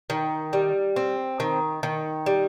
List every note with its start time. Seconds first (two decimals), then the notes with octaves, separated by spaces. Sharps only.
0.10 D#3
0.53 G3
0.96 C4
1.40 D#3
1.83 D#3
2.26 G3